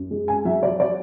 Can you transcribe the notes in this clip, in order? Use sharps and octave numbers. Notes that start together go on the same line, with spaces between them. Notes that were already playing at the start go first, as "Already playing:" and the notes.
Already playing: F#2
G#3
G#5
F#3 E5
D5
D5